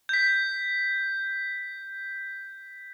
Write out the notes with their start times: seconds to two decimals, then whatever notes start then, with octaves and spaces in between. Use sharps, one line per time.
0.09 G6 B6